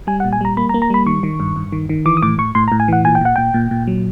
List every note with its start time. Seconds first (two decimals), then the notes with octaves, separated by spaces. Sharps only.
0.07 G3 G#5
0.20 F#5
0.24 A#2
0.33 G#5
0.41 G3 A#5
0.57 A#3 B5
0.69 A#5
0.74 A#3
0.82 A#5
0.90 G3 B5
1.06 D#3 C#6
1.23 D#3
1.40 G2
1.56 G2
1.72 D#3
1.89 D#3
2.06 E3 D6
2.17 D#6
2.22 A2 D6
2.38 A2 C#6
2.55 A2 C6
2.68 A#5
2.72 A2
2.80 G#5
2.88 E3 F#5
3.05 A#2 G#5
3.15 G5
3.21 A#2 F#5
3.36 A#2 G5
3.54 A#2
3.71 A#2
3.87 F#3